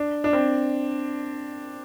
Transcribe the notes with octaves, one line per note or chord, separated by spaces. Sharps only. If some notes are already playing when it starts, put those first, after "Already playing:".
Already playing: D4
D4
C4